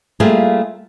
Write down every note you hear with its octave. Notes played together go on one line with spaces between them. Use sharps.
G3 A3 A#3 F4 G#4